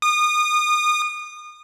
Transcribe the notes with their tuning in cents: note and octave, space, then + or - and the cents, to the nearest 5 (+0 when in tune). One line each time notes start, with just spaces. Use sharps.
D#6 -30